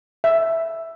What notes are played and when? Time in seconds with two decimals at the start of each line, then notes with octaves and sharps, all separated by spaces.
0.24 E5